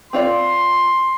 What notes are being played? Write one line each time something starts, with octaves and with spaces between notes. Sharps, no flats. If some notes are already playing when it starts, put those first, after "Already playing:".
C4 F4 D5 C6